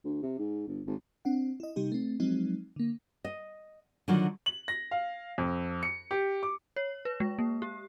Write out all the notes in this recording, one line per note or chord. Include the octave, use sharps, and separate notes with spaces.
D2
C3
G#2
G1
G#1
C4 D4 F#5
E4 D#5
C3 G3 D#4 G4
A3 C4
F3 F#3 G#3 C4 D#4
D3 A#3
D#5
D3 D#3 F#3 F4 F#4
F#7
A#6
F5
F2
C#7
G4
D6
C#5
B4
G#3
A#3
G4